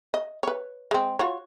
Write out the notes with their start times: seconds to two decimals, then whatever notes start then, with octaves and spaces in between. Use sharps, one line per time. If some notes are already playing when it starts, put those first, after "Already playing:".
0.14 D#5
0.43 B4 C#5
0.91 G#3 C4
1.19 F4 F#4 C#5